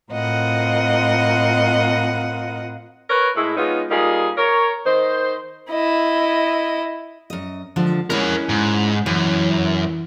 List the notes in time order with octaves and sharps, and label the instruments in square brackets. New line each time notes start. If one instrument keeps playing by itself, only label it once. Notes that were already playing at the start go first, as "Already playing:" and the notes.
[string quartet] A2 C4 F4 A#4 D#5 F#5
[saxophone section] A#4 B4 C#5
A2 G#3 E4
G#3 B3 C#4 D#4 F4
G3 A#3 D#4 F4 G#4
A#4 C#5
D#3 D#4 C5
[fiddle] E4 D#5
[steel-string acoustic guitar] F#2 D#5
D3 F3 G#3
[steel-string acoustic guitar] G#3 C#4 E4 [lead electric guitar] A#4 C#5
[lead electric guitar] G#2
[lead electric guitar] F#2 [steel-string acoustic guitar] E3